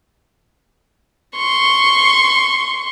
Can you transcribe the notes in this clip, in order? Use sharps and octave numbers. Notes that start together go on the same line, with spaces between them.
C6 C#6